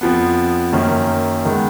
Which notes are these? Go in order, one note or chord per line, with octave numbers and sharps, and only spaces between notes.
F2 F3 B3
F#2 D#3 A#3 C#4
D#3 G#3 B3